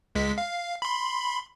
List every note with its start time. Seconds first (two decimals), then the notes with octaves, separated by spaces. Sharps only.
0.15 C#2 G#3 B6
0.38 F5
0.82 B5 C6